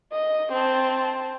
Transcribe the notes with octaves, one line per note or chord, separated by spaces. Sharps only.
D#5
C4 A5